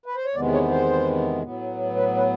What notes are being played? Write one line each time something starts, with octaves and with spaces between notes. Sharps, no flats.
B4
C5
C#5
E2 C3 D#3 G#3 B3 D5
C#5
C5
A2 F#3 B3
B4
B4